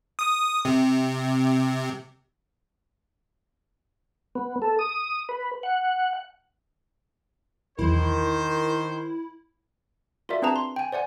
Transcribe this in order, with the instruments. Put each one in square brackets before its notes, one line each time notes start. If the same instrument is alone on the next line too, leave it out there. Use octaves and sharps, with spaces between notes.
[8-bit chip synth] D#6
C3
[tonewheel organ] B3
A4
D#6
B4
F#5
[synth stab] B1 E2 [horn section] D#3 C5 [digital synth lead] E4 [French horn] A#4
[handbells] F4 F#4 A#4 D5 E5
C4 D4 G#4 B4 A5 A#5
C6
G5 G#5
C5 D5 F#5 G#5